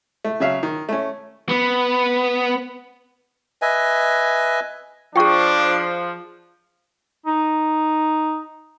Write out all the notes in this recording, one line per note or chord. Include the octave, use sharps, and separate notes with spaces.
A3
C#3 F#3 E5 F5
D#3
A3 C#4
B3
B4 D#5 E5 G#5
F3 D4 F4 G#4 G5 C#6
D#4